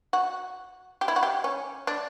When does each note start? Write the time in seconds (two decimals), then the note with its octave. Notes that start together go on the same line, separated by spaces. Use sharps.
0.13 F#4
1.01 G4
1.08 E4
1.16 F#4
1.23 G4
1.44 C#4
1.87 D4